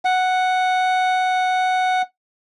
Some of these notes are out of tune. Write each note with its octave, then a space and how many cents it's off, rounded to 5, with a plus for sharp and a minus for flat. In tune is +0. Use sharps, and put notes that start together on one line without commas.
F#5 +0